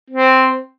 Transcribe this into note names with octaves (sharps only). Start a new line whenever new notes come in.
C4